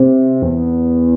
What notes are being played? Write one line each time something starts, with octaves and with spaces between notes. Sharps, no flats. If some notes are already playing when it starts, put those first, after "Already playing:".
Already playing: C3
E2